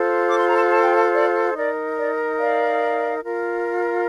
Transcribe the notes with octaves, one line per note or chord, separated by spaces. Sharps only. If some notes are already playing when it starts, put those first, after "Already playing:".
Already playing: F4 A4 C5
D6
C6
A#5
A5 C6
A5
G5
F5 A5
D5
D#4 A#4 D5
D5
D5 F5
F4 A#4